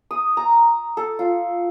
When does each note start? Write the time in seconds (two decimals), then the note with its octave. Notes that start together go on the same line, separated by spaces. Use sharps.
0.11 D#6
0.37 A#5
0.97 A4
1.19 F4